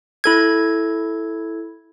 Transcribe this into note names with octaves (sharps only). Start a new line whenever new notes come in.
E4 A4 G#6